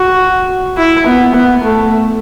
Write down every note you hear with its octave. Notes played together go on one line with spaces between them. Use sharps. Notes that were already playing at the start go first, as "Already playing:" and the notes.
Already playing: F#4
E4
B3
B3
A3